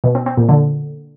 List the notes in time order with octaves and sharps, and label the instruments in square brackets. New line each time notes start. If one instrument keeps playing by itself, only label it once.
[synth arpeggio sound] B2
C4
C4
A#2
D3